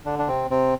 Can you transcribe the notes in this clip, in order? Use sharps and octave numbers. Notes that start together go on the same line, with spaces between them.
D3 D4
D4
C3 C4
C3 C4